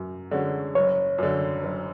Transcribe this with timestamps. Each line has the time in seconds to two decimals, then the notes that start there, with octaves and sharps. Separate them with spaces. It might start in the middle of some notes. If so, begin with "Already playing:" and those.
Already playing: F#2
0.31 D3 G#3 C#4 F#4
0.75 F#1 C#5
1.18 F#2 D3
1.63 F#1